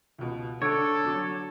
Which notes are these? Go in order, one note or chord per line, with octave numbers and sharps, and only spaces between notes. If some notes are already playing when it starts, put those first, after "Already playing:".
C#2 B2
D3 A4 C#5 D6 D7
F#3 D6